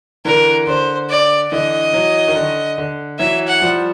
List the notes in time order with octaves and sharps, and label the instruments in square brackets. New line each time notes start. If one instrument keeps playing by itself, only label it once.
[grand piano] D3 E3 [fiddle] A#4
[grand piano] D3 [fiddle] C5
[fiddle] D5
[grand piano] D3 E3 [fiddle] D#5
[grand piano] E3 F#3
D#3
D3
D3
[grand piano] E3 F#3 [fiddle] E5
[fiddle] F#5
[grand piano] F3 G3